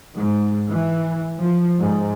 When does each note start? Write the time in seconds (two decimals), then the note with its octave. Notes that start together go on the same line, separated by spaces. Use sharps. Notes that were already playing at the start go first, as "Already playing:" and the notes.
0.14 G#2
0.70 E3
1.40 F3
1.80 G#2